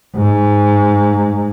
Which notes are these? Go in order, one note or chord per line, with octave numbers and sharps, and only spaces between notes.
G#2